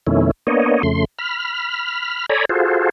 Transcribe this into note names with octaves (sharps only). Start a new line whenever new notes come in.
F2 B2 D#3 A3 C#4 E4
A#3 B3 D4 C#5 D#5
F2 C#3 A3 C6
B5 F6
A4 C#5 D5 G#5 A#5 B5
F4 F#4 G#4 A4 C5